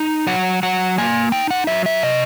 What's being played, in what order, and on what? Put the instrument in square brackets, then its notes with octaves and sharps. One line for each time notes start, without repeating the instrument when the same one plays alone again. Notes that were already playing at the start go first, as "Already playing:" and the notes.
Already playing: [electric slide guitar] D#4
F#3 F#5
F#3 F#5
A#3 G#5
D#4 G5
F#5
F#3 E5
E5
C3 D#5